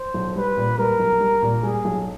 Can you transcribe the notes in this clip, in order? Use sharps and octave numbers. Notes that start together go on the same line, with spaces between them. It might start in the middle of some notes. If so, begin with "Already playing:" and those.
Already playing: C5
B1
G3 B4
A#2
G3 A#4
B1
G3
A#2
G3 G#4
B1